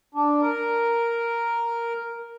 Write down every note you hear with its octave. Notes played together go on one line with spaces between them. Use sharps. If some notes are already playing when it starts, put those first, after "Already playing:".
D4
A#4